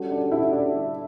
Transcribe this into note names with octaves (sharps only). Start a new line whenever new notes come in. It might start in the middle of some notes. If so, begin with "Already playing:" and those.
Already playing: G3 C#4 F#4 A4
D4
E4
D4